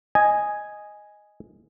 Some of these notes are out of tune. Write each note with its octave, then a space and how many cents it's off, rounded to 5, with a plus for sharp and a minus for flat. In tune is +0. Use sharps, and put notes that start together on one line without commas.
D#5 +0 G#5 +0